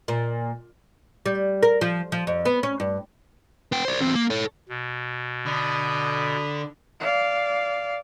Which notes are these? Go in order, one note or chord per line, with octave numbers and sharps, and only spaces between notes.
A#2
G3
A#4
F3
F3
F2
B3
C#4
G2
B3 G5
C5 D5
E2 C4
A#3
A4 C#5
B2
D3 B5 D#6
D5 F5